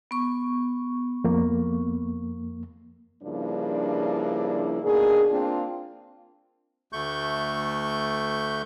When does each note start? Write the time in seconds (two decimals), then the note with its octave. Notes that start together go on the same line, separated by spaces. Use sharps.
0.11 B3 C#6
1.24 F2 A#3
3.23 G2 C#3 F3 A#3 D4 E4
4.82 B2 D#3 A#3 D4 G#4
5.30 A#3 C4 D4 F4
6.93 D2 A3 C#6 G6